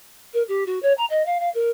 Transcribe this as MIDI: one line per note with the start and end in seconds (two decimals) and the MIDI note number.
0.33 0.43 70
0.48 0.64 67
0.66 0.79 66
0.82 0.93 73
0.97 1.05 82
1.10 1.25 75
1.26 1.38 77
1.40 1.49 77
1.54 1.70 70